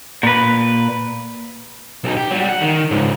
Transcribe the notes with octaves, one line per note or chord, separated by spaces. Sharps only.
A#2 B4
B1 D#4
G4
F#3 G3
F#5
D#3
C#2 G#2